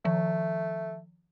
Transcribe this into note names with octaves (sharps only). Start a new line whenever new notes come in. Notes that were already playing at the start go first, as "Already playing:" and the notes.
D#3 F3 A3